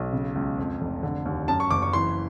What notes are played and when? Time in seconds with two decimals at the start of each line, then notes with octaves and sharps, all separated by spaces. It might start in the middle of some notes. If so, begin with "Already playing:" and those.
Already playing: B1
0.13 C#3
0.35 C#2
0.58 F2
0.81 F1
1.03 D3
1.26 D#2
1.48 F#2 A5
1.60 C#6
1.71 F#1 D6
1.82 C#6
1.93 E3 C6